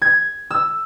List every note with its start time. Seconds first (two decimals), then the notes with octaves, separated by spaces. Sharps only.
0.02 G#6
0.51 E6